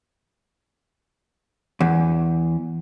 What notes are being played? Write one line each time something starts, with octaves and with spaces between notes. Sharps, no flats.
E2